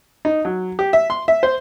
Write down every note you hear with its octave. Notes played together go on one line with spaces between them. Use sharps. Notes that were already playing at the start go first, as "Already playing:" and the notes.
D#4
F#3
G4
E5
C6
E5
C5